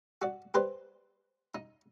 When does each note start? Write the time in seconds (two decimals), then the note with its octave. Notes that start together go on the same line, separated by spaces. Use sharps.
0.22 F#4 D5
0.54 G4 B4 C5 D5
1.55 D#4